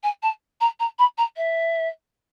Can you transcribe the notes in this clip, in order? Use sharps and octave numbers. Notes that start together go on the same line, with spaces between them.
G#5
A5
A#5
A#5
B5
A#5
E5